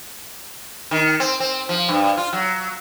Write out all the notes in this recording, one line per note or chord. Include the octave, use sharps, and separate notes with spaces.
D#3
C4
C4
F3
G2
F4
F#3